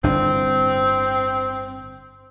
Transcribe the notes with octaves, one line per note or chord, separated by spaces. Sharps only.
G1 A2 C4 D4